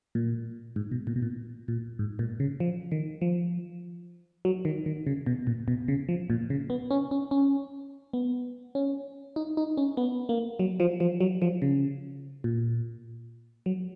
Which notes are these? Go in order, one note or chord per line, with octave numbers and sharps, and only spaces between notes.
A#2
G#2
B2
A#2
B2
A#2
A#2
G#2
A#2
C#3
F3
D#3
F3
F#3
D#3
D#3
C#3
B2
A#2
B2
C#3
F3
A#2
C#3
B3
C#4
C#4
C#4
B3
C#4
D#4
D#4
C#4
B3
A#3
F#3
F3
F3
F#3
F3
C#3
A#2
F#3